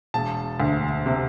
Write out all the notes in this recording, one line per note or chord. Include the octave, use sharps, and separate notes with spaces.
E1 A5
D2
C3